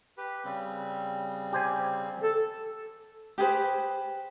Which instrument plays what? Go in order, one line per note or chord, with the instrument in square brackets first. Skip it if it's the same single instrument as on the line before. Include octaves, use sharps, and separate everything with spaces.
[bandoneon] G4 B4
C#3 G3 C4
[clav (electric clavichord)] G4 C5 G#5
[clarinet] A4
[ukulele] G4 G#4 B4 C5